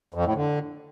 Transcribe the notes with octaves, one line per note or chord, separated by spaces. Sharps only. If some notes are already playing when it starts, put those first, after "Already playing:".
F2
A2
D3